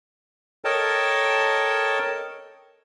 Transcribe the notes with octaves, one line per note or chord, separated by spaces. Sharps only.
A4 A#4 C#5 D#5 G5 A5